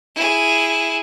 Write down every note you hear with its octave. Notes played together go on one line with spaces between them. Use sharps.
E4 G#4